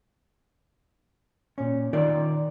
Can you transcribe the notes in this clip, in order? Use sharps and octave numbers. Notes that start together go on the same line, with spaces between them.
A#2 C#4
D#3 D#4 F4 A#4 D5